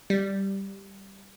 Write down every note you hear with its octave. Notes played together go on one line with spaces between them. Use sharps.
G3